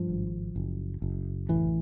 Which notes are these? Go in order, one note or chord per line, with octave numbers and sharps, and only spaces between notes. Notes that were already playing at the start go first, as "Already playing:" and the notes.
Already playing: G2 F3
G#1
F#1
F#1
A1 E3